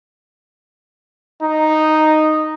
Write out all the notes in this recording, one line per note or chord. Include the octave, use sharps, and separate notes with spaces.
D#4